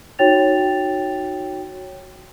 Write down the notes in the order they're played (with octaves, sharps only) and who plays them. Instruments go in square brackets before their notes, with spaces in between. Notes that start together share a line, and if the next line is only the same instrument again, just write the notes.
[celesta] D#4 F#4 C#5 G5 A6 F7